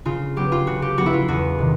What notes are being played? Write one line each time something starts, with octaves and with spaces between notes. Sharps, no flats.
C#3 F4
F#3 B3 G4
F4
C#3 F#4
G4
F#3 B3 F#4
E4
F4
E2 F#4
C3 D#3